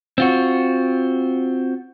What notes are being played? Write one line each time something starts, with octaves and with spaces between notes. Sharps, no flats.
C4 F4 F#4